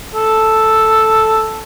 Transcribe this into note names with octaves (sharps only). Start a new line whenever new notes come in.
A4